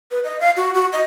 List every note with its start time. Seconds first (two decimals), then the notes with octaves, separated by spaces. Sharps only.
0.11 B4
0.24 D#5
0.40 F5
0.57 F#4
0.74 F#4
0.93 D#5